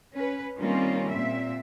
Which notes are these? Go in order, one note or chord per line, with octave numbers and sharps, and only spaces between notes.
C#4 B4
D#3 G3 A#3 C4 C#4 F4
A#2 C4 E5